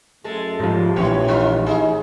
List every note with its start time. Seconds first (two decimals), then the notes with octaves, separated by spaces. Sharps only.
0.24 F#2 G#3 A3 A4
0.60 G#2 F3 G4
0.96 A#1 A2 E3 B3 C#5
1.28 G#3 D#4 F4
1.66 D#4 G#4